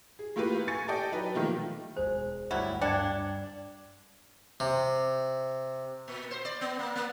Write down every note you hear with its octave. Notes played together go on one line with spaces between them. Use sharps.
G#4
A3 A#3 E4 F4 G4 B4
G#5 C#6 A6 C#7
G4 A4 D5 D#5 G5
F#3 D#4 B4
B2 D#3 F3 A3 A#3
E1 G#4 C5
G1 D2 F#3 G3 E4
G2 D4 D5 F5 G5 G#6
C3
A#2
C5
D5
B3
A#3
A#3